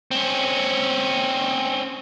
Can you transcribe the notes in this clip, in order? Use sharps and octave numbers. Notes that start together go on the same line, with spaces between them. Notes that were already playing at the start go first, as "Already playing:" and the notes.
C4 C#4